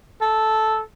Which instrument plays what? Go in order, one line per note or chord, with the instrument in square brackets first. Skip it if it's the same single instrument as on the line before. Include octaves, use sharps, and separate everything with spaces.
[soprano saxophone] A4